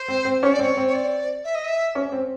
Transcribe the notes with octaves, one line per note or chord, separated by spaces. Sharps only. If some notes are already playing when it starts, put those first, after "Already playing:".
Already playing: C5
C4
C4
C#4 C#5
D5
C4
C#5
C4
C#5
D5
E5
D#5
E5
C#4
C4